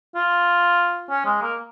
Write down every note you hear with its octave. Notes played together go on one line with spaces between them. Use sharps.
F4
C#4
G#3
A#3